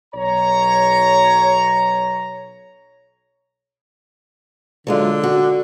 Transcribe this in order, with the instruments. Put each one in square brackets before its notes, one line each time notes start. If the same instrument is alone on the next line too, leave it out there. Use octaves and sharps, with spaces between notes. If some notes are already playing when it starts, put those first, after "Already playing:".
[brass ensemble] B1 C#5 A#5
[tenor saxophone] D3 [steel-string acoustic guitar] F#3 G#3 F4
[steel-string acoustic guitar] F#4